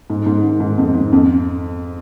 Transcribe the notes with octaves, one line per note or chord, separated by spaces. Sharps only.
G#2
G#2
D#3
G#2
F2
G#2
F2